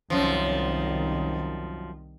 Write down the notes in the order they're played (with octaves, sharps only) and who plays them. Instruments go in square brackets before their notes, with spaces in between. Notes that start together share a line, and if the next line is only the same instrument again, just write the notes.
[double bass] C2 D#3 [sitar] F#2 F3